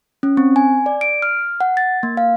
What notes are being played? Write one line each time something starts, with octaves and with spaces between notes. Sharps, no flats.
C#4
C4
G#5
D5
D7
F6
F#5
A6
A#3
F5